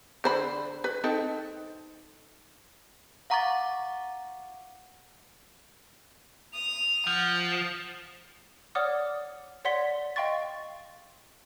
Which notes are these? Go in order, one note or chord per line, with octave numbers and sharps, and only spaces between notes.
D3 C5 B5
B4
C4 D#4 A4
F5 F#5 A#5 C#6 D6 A6
D#6 F7
F3 F#5
C#5 D5 F#5 D6 D#6 F6
C#5 D5 F#5 C6 B6 G7
D#5 F5 G5 C6 C#6 A6